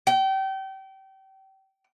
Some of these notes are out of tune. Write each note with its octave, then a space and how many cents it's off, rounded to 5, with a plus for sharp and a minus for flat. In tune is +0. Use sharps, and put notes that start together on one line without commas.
G5 -30